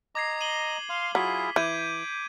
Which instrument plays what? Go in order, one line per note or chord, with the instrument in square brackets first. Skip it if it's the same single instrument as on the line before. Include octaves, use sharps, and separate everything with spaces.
[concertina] D#5 A#5 [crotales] D6 G#6 C7
[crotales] D#7 F#7 G7
[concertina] F5 C6
[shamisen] F#3 [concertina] E4 F4 G#4 [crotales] B6
[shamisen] E3 [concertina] D6 [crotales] G6 G#6 D#7